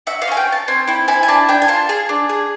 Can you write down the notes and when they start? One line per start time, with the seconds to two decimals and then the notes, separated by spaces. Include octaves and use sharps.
0.07 F#4 E5
0.22 F5
0.27 C#4 G#5
0.37 G5
0.47 C#4
0.52 A5
0.68 C4 G#5
0.88 E4 G5
1.08 E4 G#5
1.23 G#5
1.28 D4 A5
1.49 D4 G5
1.62 G#5
1.68 F4 A5
1.89 G#4
2.09 D4
2.29 G#4